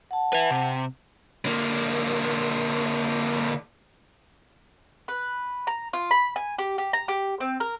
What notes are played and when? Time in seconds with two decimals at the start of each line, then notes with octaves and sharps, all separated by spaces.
0.11 F#5 A5
0.33 B4 E5
0.51 C3
1.45 D3 A#3
5.08 B4
5.67 A#5
5.93 F4
6.11 B5
6.36 G#5
6.59 G4
6.78 G4
6.93 A#5
7.08 G4
7.40 C4
7.60 A#4